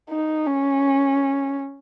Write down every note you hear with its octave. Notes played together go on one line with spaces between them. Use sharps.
D#4
C#4